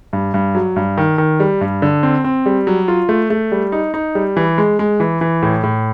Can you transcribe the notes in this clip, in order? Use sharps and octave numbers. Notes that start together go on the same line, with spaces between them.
G2
G2
F#3
G2
D#3
D#3
G3
G2
D3
C4
C4
G3
F#3
F4
A3
A3
G3
D#4
D#4
G3
E3
G#3
G#3
E3
E3
A2
A2